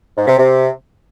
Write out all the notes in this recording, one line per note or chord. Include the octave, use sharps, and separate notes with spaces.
G#2
C3
C3